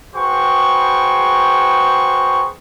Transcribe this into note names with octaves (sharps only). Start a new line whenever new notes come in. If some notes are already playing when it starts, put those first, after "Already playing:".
F#4 G#4 B4 C5 G5 C#6